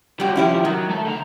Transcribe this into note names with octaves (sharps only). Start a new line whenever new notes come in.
F#2 G3 F#4 G4
D#3 F3 C#4 E4 G4
D#3 F#3
A3 A4
D3 A#5